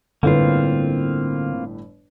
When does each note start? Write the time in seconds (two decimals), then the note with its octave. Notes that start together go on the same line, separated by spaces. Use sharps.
0.23 G1 A2 D3 A#3 C4 F4 B4